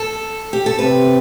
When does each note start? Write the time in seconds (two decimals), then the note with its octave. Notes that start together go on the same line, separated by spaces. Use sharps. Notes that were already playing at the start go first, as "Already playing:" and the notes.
Already playing: A4
0.53 G4
0.66 A4
0.79 C3 B4